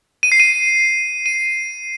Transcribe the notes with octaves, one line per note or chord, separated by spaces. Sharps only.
D#7
C7
D#7
D#7